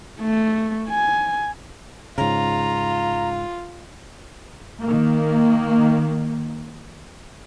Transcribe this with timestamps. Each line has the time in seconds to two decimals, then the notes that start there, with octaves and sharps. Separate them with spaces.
0.21 A3
0.89 G#5
2.18 G#2 C#3 F4 A#5
4.81 D#3 A#3